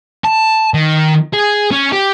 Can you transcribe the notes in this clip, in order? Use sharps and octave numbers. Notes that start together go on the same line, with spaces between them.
A5
D#3
G#4
C#4
G4